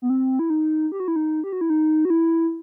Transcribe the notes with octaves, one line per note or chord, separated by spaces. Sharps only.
B3
C4
E4
D#4
G4
F#4
E4
D#4
G4
F#4
E4
D#4
F#4
E4